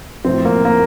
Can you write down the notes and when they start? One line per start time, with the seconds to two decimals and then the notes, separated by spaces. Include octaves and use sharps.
0.25 A2 F3 C4
0.45 A#3
0.65 A#3